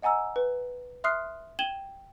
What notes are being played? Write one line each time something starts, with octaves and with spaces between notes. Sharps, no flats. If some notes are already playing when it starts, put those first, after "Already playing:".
D#5 F#5 G#5 A#5 E6
B4
E5 C6 D#6 F6 F#6 C7
G5 G#6 D#7 E7 F#7 G7